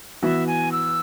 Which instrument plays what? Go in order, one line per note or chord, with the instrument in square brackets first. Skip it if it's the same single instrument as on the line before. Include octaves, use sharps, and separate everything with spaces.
[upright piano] E3 B3 F#4 [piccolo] E5
[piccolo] G#5
E6